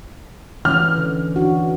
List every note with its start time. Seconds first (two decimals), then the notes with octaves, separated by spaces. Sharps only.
0.65 E3 C#4 F6
0.98 D3
1.36 E3 D4 F#4